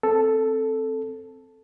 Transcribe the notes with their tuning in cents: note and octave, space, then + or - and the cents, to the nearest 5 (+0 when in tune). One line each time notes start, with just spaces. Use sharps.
C4 +0 A4 +0